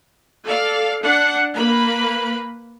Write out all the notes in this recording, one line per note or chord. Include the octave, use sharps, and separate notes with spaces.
A4 D5 F5
D4 F#5
A#3 B4 B5